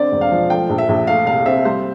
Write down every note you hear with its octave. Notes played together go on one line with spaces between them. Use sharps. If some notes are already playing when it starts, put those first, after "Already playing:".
Already playing: D3 C4 D5
E1
F5
F3
A3 G5
A#1
E5
A#1
A3 F5
C2 F5
C4 E5
G3 C5